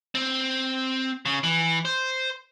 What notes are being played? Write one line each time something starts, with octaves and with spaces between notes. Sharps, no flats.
C4
C#3
E3
C5